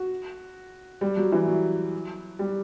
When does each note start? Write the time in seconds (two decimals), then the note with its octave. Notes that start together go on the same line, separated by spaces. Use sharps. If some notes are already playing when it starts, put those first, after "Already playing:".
Already playing: F#4
1.01 G3
1.17 F#3
1.32 E3
1.47 F#3
2.39 G3